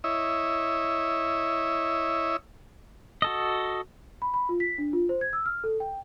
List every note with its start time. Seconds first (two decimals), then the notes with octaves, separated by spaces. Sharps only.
0.04 E4 C#5 D#5 E5
3.22 F#4 A4 D#5
4.22 B5
4.34 B5
4.49 F4
4.60 B6
4.78 D4
4.93 F4
5.09 C5
5.21 G#6
5.33 E6
5.46 F6
5.64 A4
5.80 G5